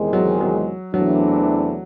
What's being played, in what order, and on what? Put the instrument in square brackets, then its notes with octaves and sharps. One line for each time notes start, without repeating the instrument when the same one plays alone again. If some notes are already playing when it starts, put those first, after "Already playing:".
Already playing: [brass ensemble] E2 C3 D#3 G#3
[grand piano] F#3
F#3
[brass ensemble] E2 C3 E3 A3 D4 [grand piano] F#3